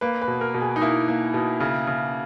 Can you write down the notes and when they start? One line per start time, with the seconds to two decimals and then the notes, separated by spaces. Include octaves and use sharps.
0.01 A#3 B4
0.22 B4
0.28 B2
0.41 A#4
0.54 B2
0.61 G#4
0.76 D#4
0.81 A#3 E4
1.08 A#3
1.34 B2
1.60 C#3
1.87 C#3